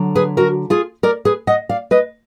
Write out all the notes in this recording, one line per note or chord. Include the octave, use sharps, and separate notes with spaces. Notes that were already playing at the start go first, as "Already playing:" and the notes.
Already playing: D3 F#3
G#4 B4
F#4 A#4
F4 G#4
A#4 D5
G#4 B4
D#5 F#5
D5 F5
B4 D#5